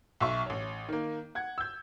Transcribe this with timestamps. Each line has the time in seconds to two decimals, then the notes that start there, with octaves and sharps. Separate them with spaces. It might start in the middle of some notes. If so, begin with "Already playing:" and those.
0.20 B1 E5 C#6
0.46 A1 C#5
0.88 D#3 A#3
1.35 F#5 G#6
1.58 E6 G6